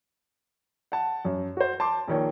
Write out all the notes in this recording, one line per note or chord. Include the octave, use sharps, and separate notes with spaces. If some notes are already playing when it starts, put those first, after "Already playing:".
F#5 A5
F#2
F#4 C5
A5 C6 D6
A#1 D#3 C#5